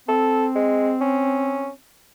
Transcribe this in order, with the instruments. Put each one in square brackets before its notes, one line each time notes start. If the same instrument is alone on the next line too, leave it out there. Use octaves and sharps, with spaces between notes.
[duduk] C4 [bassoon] A4
[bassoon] G#3
C#4